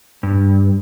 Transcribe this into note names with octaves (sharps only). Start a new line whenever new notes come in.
G2